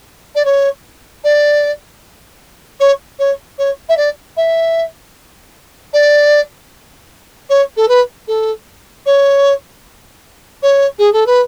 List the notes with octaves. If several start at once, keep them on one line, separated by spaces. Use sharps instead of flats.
D5
C#5
D5
C#5
C#5
C#5
E5
D5
E5
D5
C#5
A4
B4
A4
C#5
C#5
G#4
A4
B4